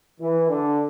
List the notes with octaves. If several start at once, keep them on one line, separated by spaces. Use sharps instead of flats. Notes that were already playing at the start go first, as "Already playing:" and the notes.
E3
D3